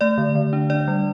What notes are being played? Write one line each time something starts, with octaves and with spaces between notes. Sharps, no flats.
A3 D5
D3
D3
D4
D4 D5
G3